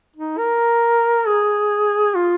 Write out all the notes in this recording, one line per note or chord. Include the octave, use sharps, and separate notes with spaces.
D#4
A#4
G#4
F4